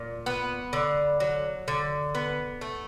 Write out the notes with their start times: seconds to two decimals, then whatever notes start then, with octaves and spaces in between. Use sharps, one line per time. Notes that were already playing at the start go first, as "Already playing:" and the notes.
Already playing: A#2
0.26 B3
0.73 D3
1.20 F#3
1.68 D3
2.15 B3
2.61 A3